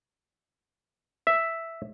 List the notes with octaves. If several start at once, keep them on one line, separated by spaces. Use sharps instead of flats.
E5